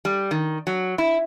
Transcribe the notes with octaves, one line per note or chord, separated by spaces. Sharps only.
G3
D#3
F#3
E4